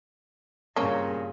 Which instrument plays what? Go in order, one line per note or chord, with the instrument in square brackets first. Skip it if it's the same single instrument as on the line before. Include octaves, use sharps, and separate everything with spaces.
[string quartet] G2 A#2 C#3 [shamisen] A#3 C4 C#4